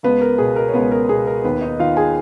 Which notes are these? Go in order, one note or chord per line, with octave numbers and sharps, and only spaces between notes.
C#2 B3 B4
A#4
B2 G#4
A#4
C#5
C#2 B3 B4
A#4
B2 G#4
A#4
D#2 B3 B4
D#4 D#5
D#3 F4 F5
G#4 G#5